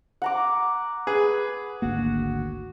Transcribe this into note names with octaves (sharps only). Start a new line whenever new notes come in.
F#5 A#5 D6
G#4 B4
G#1 D2 A#3 F#4